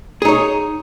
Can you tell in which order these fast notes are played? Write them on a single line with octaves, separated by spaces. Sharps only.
G#4 D#4 C#5